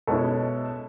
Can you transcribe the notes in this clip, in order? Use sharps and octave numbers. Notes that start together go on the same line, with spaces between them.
B2 G#3 C#4 E4 A4